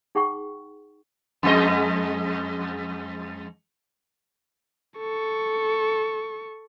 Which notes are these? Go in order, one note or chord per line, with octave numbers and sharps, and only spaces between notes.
D#4 G#4 F#5 G5 C#6
F2 G#3 D#5
A4 C#6